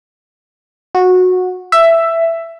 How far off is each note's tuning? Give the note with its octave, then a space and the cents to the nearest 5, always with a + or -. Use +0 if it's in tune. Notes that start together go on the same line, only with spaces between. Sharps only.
F#4 -15
E5 +10